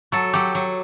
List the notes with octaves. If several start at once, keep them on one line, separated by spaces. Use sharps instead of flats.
F#3 A4
F#3 G4
F#3